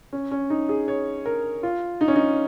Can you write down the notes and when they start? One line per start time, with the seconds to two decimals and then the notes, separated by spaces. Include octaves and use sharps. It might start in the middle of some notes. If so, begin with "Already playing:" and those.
0.13 C#4
0.31 C#4
0.50 D#4
0.69 G#4
0.88 C#5
1.26 A#4
1.63 F4
2.01 D#4
2.08 C#4
2.16 D#4